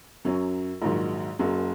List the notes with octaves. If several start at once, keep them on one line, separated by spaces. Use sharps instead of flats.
F#2 F#3 C#4
A#1 G#2 D#3 F#3
F#1 F#2 F#3